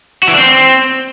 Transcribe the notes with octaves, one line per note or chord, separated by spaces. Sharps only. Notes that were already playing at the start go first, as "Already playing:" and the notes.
F#4
E3
D4
C4